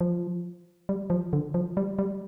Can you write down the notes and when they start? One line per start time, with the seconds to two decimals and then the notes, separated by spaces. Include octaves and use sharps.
0.01 F3
0.89 G3
1.10 F3
1.33 D3
1.54 F3
1.77 G3
1.99 G3